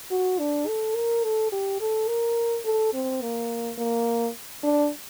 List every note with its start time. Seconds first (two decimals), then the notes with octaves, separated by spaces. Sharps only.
0.11 F#4
0.39 D4
0.67 A4
0.96 A#4
1.24 A4
1.52 G4
1.80 A4
2.08 A#4
2.65 A4
2.94 C4
3.22 A#3
3.78 A#3
4.63 D4